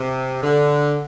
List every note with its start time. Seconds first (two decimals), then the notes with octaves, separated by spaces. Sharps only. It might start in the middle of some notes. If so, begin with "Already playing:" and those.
Already playing: C3
0.43 D3